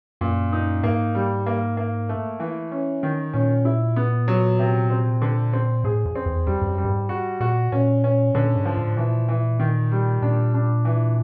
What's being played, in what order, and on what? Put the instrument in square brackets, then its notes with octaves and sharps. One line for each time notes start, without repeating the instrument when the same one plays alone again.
[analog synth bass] F#2 [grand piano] A#2
[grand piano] D#4
[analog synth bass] G#2 [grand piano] A#3
[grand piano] G3
A#3
A#3
A3
E3
C#4
D#3
[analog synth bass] A#2 [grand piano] C#4
[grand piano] E4
B3
F#3
C3
C4
D3
C4
[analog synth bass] A2 [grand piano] G#4
[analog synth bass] F2
[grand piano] C4
[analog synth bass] E2
[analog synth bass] F2 [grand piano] G3
[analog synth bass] G2
F#2
[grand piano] G3
[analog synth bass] G2
G#2
[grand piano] F#4
[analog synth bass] A#2 [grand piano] F#4
[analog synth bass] A#2 [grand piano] C#4
[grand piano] C#4
[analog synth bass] A#2 [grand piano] D3
[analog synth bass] G#2
[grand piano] F3
[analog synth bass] A2
[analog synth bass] A#2 [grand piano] E3
[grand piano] E3
D#3
G3
[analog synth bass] A#2 [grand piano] D4
[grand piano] D4
E3